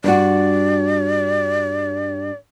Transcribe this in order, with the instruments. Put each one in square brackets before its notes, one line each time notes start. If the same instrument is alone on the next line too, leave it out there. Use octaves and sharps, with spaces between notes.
[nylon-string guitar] G2 F#4 [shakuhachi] D5